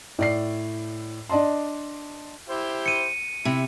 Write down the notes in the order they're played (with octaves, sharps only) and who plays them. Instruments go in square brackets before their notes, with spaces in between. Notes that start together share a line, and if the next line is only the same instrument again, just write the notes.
[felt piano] A2 D5 C7
D4 D5 D#5 A5 C6
[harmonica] E4 G4 C5
[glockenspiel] C#7 D#7
[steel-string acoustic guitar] C3 [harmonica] E4